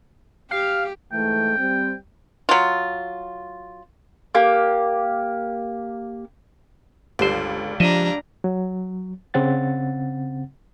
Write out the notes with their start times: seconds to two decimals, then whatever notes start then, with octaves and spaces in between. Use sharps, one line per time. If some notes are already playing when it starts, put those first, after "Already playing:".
0.51 G4 F5
1.12 G#2 E3 A3 G5
1.58 G3 C4
2.49 F#3 F4
4.35 A#3 G4
7.19 G1 C#2 D3 G3 C5
7.80 F3 D4 D#5 E5 A#5
8.44 F#3
9.34 C#3 C4 F#5 A6